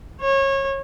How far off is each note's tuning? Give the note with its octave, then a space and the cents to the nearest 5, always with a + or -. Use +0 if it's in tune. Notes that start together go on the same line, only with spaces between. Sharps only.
C#5 -25